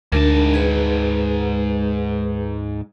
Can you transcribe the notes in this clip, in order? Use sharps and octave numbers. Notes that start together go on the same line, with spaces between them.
D2 G#2 D4 A#4 A5
G#4 B4